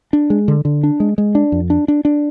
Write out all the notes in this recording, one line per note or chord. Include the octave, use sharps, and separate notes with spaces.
D4
G#3
D3
D3
D4
G#3
G#3
D4
F2
D4
D4
D4